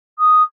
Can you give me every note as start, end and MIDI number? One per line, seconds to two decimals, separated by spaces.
0.19 0.42 87